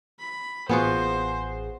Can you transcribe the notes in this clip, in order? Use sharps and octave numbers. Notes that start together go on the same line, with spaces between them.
B5
A1 B3 F4 F#4 G#4 C5 C7